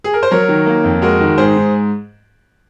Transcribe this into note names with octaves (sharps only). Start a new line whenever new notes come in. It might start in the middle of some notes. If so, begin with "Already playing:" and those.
G#4
A#4
C5
F#3 A#4 C#5
D#3
A#3
F2
G#3 F#4 A#4
D#3
G#2 G#4 C5
G#2